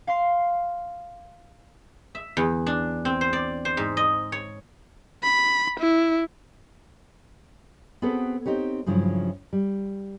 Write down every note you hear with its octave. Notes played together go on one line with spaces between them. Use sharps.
F5 C6 C7
E5
E2
D4
C4
C5
D5
C5
G#2
D#5
C#5
B5
E4
B3 C4 F#4 G#4 A4 B4
C4 D#4 G4 C#5
G2 C#3 F3 F#3 E4
G3